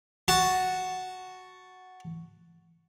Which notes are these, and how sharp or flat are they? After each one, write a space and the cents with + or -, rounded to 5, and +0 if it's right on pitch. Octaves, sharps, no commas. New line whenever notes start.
F#4 +0 A5 +0